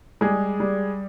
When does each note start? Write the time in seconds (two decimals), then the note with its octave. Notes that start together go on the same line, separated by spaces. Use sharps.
0.21 G3 G#3 G#4
0.60 G3